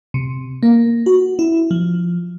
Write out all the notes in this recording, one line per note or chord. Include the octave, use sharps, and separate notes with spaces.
C3
A#3
F#4
E4
F3